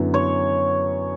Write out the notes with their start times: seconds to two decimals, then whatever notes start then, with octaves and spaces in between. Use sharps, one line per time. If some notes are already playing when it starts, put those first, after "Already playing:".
Already playing: F#2 D3 F#3 B3 E4
0.14 C#5